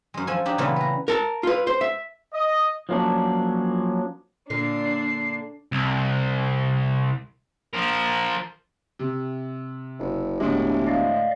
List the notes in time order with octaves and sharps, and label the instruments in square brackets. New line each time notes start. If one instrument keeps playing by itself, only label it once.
[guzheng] F#2 G#3
F3 A4 G#5
D4 D#4 G4
A#2 C#3 E3 G3 A3 B3
B4 A#5
[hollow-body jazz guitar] A#4 A5
F4 B4
C5
E5
[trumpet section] D#5
[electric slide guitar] F3 F#3 A#3 C#4 D4
[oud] A#2 D3 [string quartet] D4 [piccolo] C7
[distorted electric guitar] C2
F3 A#4
[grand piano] C3
[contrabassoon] F#1
[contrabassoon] E1 [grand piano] A2 D3 G#3 [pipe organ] G4
[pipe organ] D5 D#5 F5